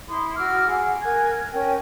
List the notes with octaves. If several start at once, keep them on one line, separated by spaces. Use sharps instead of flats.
E4 C6 D#6
F#4 D6 E6 F6
G#4 F#5
A#4 G#5 F#6 G#6
C#4 A#4 G5